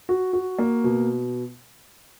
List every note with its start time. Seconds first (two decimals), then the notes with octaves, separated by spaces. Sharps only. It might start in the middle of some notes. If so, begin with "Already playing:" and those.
0.09 F#4
0.33 F#4
0.59 A#3
0.84 B2